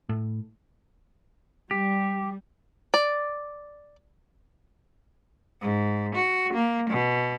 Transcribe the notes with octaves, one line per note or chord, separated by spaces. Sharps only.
A2
G3 G4
D5
G#2
F#4
A#3
B2